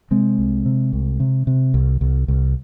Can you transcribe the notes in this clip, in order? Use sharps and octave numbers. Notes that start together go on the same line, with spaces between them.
C3 G#3 C4
C2
C3
C2
C3
C3
C2
C2
C2